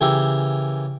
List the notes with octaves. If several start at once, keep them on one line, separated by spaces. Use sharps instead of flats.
C#3 E3 G4 A#4 E5